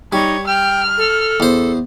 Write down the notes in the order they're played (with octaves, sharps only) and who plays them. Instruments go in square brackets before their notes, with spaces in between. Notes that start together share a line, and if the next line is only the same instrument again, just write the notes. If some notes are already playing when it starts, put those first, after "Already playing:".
[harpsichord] G3 [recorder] D#4 [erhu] C#5
[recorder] G5 [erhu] F6
[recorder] A4
[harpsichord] E2 C5